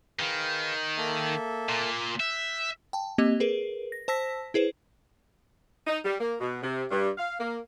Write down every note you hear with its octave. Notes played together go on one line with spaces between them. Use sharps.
D#3 G#4 B4 F5
A#3 A4 E5
A#2
E5 F#6 G6
G5 A5
A#3 C4 G4 D#5
G#4 A#4 B4
A#6
C5 A5 E6 A#6 B6
E4 G#4 B4 C5
D#4
G3
A#3
B2
C3
G2
F5
A#3